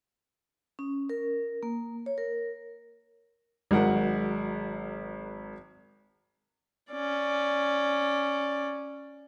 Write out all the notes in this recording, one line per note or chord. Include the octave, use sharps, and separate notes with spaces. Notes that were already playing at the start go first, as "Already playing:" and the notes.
C#4
A#4
A#3
C#5
A#4
G#1 F#3 G#3 A#4 F#5
C#4 D5